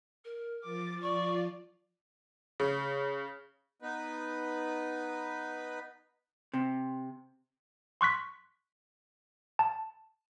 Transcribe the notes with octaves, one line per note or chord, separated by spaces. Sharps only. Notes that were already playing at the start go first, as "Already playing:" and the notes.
A#4
F3 D6 A6
F3 F4 D5 C#6
C#3
B3 D#4 B4
C3
C6 C#6 F#6 B6
A5